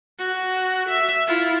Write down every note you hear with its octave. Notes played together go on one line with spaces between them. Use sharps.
F#4
E5
E4 F4